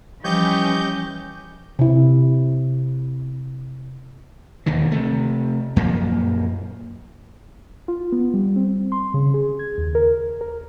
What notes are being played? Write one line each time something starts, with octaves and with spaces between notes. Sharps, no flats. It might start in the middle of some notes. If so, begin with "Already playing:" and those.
E3 F3 G3 C#4 G4 D#5 C#6 G6
C3 E4
E1 D#2 D3 D#3
C3 A3
F#2 A#2 F3 A#3
F4
B3
G3
C4
C6
C#3
G#4
G#6
D#2
A#4
A#4